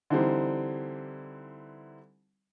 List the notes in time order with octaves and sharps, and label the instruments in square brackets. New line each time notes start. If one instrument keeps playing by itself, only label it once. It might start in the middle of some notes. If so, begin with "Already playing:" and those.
[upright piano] D3 E3 G3 C4 D#4